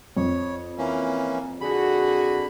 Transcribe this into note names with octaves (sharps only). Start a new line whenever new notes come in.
F2 C#5
E3 A#3 C#4
D3 F#4 G#4 B5